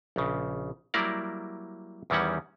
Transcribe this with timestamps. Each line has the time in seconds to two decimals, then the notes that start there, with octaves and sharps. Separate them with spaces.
0.16 A#1 C#3
0.94 F#3 G3 A#3 E4 A#4 D5
2.10 E2 D#3 E3 G3 C#4 F#5